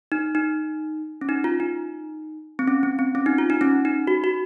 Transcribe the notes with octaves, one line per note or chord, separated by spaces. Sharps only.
D#4
D#4
C#4
D#4
F4
D#4
C4
C#4
C4
C4
C#4
D#4
F4
D#4
C#4
D#4
F#4
F#4